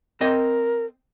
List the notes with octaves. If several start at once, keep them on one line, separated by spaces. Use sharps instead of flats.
C4 A#4 D#5 G5